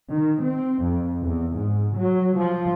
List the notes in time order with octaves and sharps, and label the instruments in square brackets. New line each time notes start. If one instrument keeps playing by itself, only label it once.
[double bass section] D#3
C4
F2
E2
G#2
F#3
F3